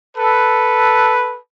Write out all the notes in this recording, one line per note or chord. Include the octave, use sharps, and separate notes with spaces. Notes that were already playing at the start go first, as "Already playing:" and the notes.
A4 B4